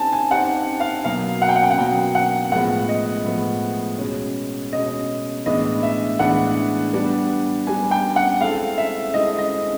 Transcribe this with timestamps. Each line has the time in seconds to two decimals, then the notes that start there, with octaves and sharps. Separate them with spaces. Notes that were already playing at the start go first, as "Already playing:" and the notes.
Already playing: C4 D#4 G4 G#5 A5
0.13 G#5
0.31 C4 D#4 G4 C5 F#5
0.80 F5
1.05 B2 F#3 A#3 F5
1.42 F#5
1.49 G5
1.56 F#5
1.63 G5
1.71 F#5
1.78 B2 F#3 A#3 G5
2.15 F#5
2.52 A2 F3 G#3 B3 F#5
2.89 D#5
3.26 A2 F3 G#3 B3
3.99 B2 G#3 C#4
4.72 B2 G#3 C#4 D#5
5.46 A2 E3 G#3 B3 D4 D#5
5.83 E5
6.19 A2 E3 G#3 B3 D4 F#5
6.93 G3 B3 D4
7.67 G3 B3 D4 G#5
7.91 G5
8.16 F#5
8.41 G#3 C4 E4 A4 F5
8.78 E5
9.14 G#3 C4 E4 A4 D#5
9.38 D#5